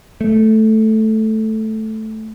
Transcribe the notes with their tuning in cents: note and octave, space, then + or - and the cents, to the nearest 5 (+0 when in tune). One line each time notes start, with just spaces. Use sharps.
A3 -5